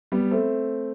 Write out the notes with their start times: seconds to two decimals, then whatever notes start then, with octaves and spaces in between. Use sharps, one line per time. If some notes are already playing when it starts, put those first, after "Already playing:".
0.12 G3 B3
0.31 A3 C4